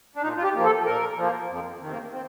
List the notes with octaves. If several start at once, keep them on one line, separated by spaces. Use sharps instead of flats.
D4
A#2 D#4
F4
G4
F3 A#3
A4
A#2 A#4
F3 A#3
F2
C3 D#3
A#3
C4